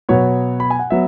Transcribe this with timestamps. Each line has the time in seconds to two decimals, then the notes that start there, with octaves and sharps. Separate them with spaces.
0.09 B2 F#3 B3 C#5
0.60 B5
0.70 G#5
0.79 F#5
0.90 F#3 B3 E5